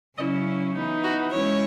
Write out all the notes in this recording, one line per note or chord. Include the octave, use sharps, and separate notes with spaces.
C#3 F#3 C#4 E4 D#5
E3 B3 D#4
F#4
G#3 C#4 E4 C#5